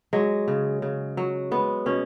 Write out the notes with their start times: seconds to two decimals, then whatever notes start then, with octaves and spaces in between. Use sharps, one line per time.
0.13 F#3 G#3
0.48 C#3
0.82 C#3
1.17 F#3
1.51 G#3 B3
1.86 B2 C#4